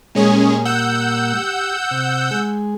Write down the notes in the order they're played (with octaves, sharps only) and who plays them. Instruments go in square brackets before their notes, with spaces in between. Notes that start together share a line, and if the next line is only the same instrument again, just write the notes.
[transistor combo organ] A#2 G3 A#3 [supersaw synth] G#3 C#4 G#4
[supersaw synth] F#5 E6 G6
[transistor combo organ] G4
C3
G#3 G#4